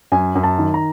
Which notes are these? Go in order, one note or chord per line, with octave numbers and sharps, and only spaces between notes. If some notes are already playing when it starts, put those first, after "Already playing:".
F#2 G#5
F#2
A5
D#3
A#5